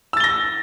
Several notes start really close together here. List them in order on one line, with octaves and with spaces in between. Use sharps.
E6 A6 G7 A#6